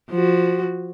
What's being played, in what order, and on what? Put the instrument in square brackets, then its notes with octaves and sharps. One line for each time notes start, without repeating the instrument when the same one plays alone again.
[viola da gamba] F3 F#4